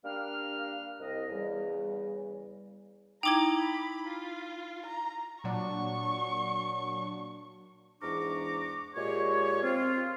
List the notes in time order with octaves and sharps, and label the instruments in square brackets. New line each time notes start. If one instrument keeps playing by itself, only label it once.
[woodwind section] G3 A#3 D4 F5 F6
C2 D#5
E2 C#3 G3
[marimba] D#4 E4 [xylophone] G5 D6 G#6 [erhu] A#5
[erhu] B5
F4
A#5
[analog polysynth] A#2 F#3 D4 [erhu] C#6
[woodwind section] E2 G#2 D4 A#5 C#6 D6
A#2 G#3 G4 C#5
C4 F4